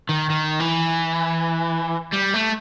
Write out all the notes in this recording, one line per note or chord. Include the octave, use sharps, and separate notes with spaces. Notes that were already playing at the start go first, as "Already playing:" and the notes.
D#3
D#3
E3
G3
A3